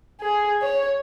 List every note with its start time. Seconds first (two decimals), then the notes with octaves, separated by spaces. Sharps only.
0.21 G#4
0.62 C#5